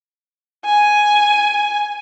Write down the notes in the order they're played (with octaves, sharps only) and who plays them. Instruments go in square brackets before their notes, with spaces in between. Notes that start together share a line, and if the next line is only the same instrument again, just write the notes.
[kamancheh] G#5